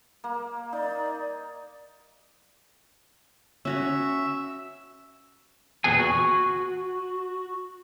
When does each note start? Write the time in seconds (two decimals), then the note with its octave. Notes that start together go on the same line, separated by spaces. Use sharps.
0.24 A#3
0.73 D#4 D5
3.65 C#4 F#4 C#5 E5
5.84 E2 A#2 D3 B3 G#4 G#5
5.99 F#4